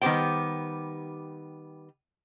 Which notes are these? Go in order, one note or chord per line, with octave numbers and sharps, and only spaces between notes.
D#3 G3 B3 G4 C5 G5